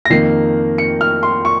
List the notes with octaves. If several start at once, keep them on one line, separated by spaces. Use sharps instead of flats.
A#6
F2 D#3 A#3 C7
C#7
F6
C6
C#6